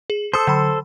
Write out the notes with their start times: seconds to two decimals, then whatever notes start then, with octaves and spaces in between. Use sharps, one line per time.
0.10 G#4
0.33 A4 C5 A5 D#6 E6
0.47 D3 F#3 B5